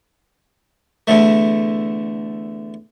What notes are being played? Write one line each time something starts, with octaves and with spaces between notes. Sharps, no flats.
E2 D3 A3